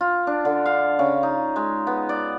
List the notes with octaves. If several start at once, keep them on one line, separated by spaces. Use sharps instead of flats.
F4
D4
D3
F5
C#3
D#4
G#3
B3
D5